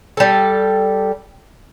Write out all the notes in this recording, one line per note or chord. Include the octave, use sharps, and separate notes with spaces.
G3 A4